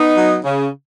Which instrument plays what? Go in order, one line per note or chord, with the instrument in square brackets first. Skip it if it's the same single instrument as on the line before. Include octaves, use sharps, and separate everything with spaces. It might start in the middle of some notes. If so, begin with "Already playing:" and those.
Already playing: [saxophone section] B3 D#4
F#3
C#3